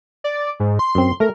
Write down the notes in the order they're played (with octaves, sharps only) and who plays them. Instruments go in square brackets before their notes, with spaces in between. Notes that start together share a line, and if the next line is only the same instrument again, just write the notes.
[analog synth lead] D5
G#2
C6
[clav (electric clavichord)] F#2 C4
[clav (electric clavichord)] A3 [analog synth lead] A#4